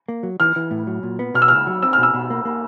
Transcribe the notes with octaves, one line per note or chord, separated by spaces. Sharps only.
A#3
F#3
E3 F6
E3
A2
F#3
A#2
B3
B2 F6
E6
C#2 F6
F#3
C4 E6
F6
B2 E6
B2
A#3
A#3